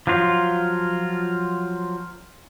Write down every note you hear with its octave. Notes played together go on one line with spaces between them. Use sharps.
F3 F#3 F4